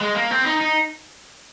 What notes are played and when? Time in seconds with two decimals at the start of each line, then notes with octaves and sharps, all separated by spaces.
0.01 G#3
0.15 A#3
0.31 C4
0.45 D#4
0.61 D#4